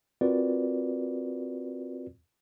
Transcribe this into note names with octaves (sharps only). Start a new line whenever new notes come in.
C4 F4 F#4 A#4 B4 D5